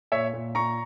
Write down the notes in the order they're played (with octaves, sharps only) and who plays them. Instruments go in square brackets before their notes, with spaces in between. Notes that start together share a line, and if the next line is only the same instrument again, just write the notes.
[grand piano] A#2 C#5 E5
A#2
A#2 A#5 C#6